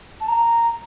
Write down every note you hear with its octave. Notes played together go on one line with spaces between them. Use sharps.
A5
A#5